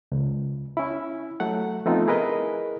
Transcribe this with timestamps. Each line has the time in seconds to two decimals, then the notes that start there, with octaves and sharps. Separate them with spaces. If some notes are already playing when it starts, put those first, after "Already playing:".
0.12 C#2
0.77 C#4 E4
1.40 F#3 A3 F#5
1.86 F3 A3 B3 C4 D#4 F4
2.07 E4 G#4 A#4 B4 D#5